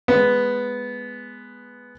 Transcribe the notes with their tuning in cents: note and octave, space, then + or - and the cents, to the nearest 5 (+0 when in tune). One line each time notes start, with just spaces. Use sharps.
G#3 +0 B3 +0